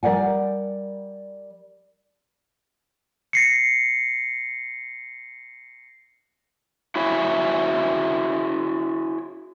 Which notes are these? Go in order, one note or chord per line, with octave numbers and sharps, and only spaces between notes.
G3 A#4 D5 F#5 G#5
A#6 C7 C#7
E4 F#4 G#4 C#5 E5